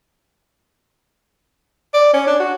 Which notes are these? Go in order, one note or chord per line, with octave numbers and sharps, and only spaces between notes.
D5
C#4
D4
F#4